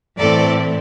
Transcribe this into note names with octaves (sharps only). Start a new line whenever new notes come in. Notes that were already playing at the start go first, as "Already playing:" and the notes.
A2 E3 C4 A4 D5